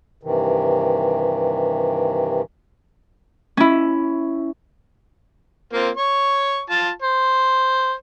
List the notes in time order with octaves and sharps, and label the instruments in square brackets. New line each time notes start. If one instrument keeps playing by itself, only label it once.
[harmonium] G2 C3 D#3 E3
[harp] C#4 E4
[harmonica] A#3 C4 F4
C#5 C#6
F4 A5
C5